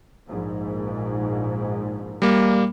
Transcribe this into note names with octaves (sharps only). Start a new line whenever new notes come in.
A#1 G#2
G3 A#3